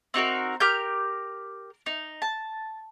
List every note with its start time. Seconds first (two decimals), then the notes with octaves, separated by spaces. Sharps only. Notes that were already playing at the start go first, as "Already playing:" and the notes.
0.14 C4 D#4 F#4 A#4
0.60 G4 A#4 F6 G6
1.86 D#4
2.22 A5